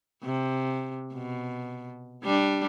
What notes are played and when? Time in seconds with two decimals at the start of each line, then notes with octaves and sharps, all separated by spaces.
0.23 C3
1.14 B2
2.23 G3 D4